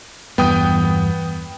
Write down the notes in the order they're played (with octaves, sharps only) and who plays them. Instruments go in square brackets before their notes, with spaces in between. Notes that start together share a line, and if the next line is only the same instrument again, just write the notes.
[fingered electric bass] E2 G2 [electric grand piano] B3 G5 D#6